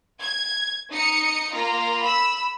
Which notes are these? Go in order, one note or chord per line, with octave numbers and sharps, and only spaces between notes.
G#6
D#4 D#6 C#7
A#3 F4 A#5
B5 E6